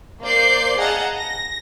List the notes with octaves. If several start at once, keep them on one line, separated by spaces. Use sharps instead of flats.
A#3 C5 D5 G6 C7
G#4 D#5 F5 F#5 A5 A#5
A#6